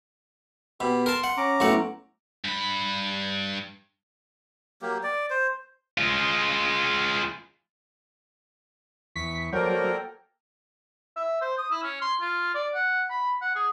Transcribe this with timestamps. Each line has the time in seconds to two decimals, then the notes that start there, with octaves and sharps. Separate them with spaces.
0.80 B2 G4 B5
1.06 A#4 A5 C6
1.24 F#5
1.37 C#4 A#5 D6
1.60 B1 A2 F#5
2.45 G2 B5
4.82 F#3 A#3 G4
5.03 D5
5.30 C5
5.98 G#3 F4
9.16 E2 C#6 B6
9.53 F#3 A#3 F#4 A4 A#4 C5 D5 G5
11.17 E5
11.41 C5
11.58 D#6
11.71 E4
11.83 C#4
12.01 C6
12.21 F4
12.54 D5
12.74 F#5
13.10 B5
13.41 F#5
13.55 G#4